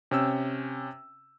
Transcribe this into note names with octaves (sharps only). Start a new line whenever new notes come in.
C3 C#4 G5 E6